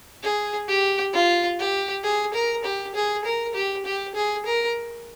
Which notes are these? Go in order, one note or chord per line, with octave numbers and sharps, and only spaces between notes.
G#4
G4
F4
G4
G#4
A#4
G4
G#4
A#4
G4
G4
G#4
A#4